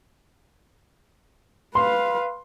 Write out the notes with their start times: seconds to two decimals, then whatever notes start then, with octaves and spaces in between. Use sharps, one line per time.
1.75 B4 F5 C6